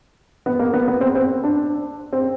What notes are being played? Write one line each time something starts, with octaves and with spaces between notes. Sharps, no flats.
B3
A#3
B3
B3
C4
C4
D4
C4